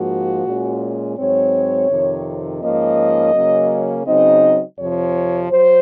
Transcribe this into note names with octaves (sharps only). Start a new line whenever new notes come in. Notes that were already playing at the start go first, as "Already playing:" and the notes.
Already playing: G#2 F3 A#3 F#4
A#2 G#3 C#4
G#2 F#3 C4 C#5
F2 C3 D#3
G#2 F3 A#3 C#4 D#5
C#3 F#3 A#3 C#4
C#3 F#3 C4 D#4 D#5
F2 C3 F3 C#5
F#3 C5